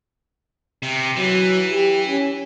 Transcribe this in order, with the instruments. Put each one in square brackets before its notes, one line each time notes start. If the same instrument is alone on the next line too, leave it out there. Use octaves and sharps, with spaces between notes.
[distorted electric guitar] C3
[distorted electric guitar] E3 [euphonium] F#3
[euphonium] G4
C#4